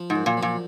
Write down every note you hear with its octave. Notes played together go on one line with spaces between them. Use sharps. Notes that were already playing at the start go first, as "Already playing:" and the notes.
Already playing: F3
G#2
F#2
A#2
F3
A#2